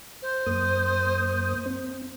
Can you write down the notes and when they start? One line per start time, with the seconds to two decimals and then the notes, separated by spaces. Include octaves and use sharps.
0.22 C5
0.46 F#2 A#3 D#6
1.66 C4